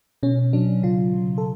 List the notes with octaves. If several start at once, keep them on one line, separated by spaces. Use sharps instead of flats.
B2 C#4
F#3 D4
C#3 F4
C#3
A4